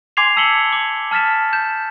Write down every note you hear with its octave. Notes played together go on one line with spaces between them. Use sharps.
G#5 C6 D6 G#6 C7 F7
A5 E6 B6 C#7 F#7 G7
D6
A5 F6 A6 B6 E7
G6 E7